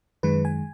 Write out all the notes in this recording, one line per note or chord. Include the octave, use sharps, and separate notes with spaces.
F#2 D#3 G#3 B4
G#5